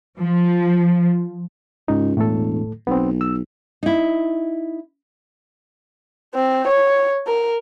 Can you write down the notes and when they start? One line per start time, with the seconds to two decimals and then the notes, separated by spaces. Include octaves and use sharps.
0.18 F3
1.88 C#2 G#2 D#4
2.17 E1 A2 A3 A4
2.87 B1 B3 C4
3.21 E6
3.83 D#4 E4
6.35 C4
6.68 C#5
7.27 A#4